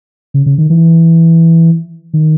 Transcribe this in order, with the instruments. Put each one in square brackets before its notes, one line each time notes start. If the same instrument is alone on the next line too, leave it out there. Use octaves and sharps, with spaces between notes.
[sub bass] C#3
C#3
D#3
E3
D#3